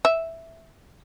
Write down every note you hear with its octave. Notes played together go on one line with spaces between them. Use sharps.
E5